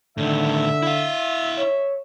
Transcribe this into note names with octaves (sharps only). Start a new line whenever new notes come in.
A2 D3 D#3 E5
E4 F5
C#5